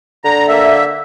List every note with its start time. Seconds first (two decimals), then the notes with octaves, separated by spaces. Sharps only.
0.24 D3 A#5
0.48 A#3 E5